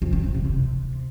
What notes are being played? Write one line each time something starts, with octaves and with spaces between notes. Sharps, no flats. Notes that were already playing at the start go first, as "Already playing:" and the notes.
F2
D#3
G2
C3
C3